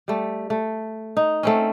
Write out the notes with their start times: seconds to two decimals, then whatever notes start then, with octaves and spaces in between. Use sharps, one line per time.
0.08 G3 A3
0.50 A3
1.17 D#4
1.43 A3 C4 C#4